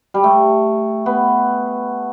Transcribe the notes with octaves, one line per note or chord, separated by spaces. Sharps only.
G3
A3
B3